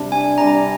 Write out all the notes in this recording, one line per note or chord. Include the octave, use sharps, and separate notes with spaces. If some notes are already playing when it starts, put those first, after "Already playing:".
Already playing: C3 G3 D4
G#5
C3 G3 D4 A#5